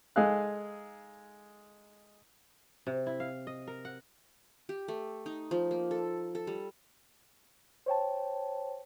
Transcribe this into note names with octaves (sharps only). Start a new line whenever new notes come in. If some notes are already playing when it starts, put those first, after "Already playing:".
G#3 D#4 G#4 A4 F5 F#6
C3
E4
F5
D#5
A#4
F#5
G4
A3
D#4
F3
A#3
A4
A4
G3
C5 C#5 G5 A5